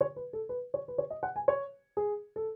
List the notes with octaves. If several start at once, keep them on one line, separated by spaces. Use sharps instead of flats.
C#5
B4
A4
B4
C#5
B4
C#5
D#5
F#5
G#5
C#5
G#4
A4